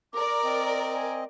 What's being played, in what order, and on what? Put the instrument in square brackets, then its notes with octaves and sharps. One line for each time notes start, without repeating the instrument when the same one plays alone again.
[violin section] A#4 D5 [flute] D6
[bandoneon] C4 D#5
[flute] G#5